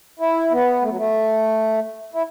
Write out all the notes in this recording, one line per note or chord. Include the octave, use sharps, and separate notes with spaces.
E4
B3
A3
F#3
A3
E4